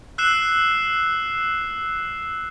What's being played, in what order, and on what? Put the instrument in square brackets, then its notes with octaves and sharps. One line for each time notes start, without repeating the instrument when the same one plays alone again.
[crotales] E6 F#6 C7 E7